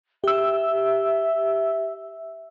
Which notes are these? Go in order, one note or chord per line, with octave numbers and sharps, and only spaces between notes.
G4 E5 E6